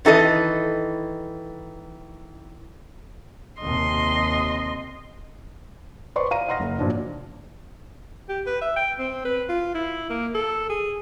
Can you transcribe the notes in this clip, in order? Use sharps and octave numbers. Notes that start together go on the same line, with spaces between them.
D#3 E3 A4 D#5
D#2 C3 D#5 C6
B4 C5 D5 C6 C#6
F5 A#5 D#7
D#5 F#5 C6 F6 A#6
F#1
A#2 F3 D4 F#4
G4
B4
E5
G5
C4
B4
F4
E4
A#3
A4
G#4